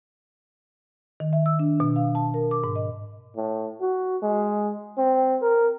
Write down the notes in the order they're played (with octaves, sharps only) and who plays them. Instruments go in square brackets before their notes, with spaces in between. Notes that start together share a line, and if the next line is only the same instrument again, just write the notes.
[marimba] D#3
E5
E6
D4
B2
F5
A5
A#4
D6
G#2
D#5
[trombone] A2
F#4
G#3
C4
A#4